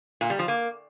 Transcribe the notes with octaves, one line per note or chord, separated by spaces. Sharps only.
A#2
G3
F3
A#3